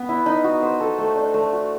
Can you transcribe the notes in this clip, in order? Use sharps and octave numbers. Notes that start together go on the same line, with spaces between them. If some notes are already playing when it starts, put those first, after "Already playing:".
Already playing: B3 B4
E4
D#4
F#4
C5
A4
A3
D4
A3
F#4